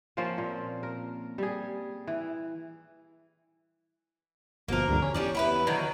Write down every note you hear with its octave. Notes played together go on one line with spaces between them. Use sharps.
F3 A#3 C4 C#4
A#2
A#4
G3 G#4
E3
G1 B2 F3 A#3 A#4
D2 G2 D3
C#4
E2 G3 C#4 D4
B3 E4 B4
D3 D#3 F#3